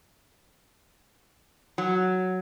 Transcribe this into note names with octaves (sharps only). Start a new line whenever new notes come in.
F#3